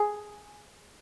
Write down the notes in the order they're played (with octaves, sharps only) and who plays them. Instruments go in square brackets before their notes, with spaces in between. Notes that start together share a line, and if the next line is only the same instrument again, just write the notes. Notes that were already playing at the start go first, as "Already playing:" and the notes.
Already playing: [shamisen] G#4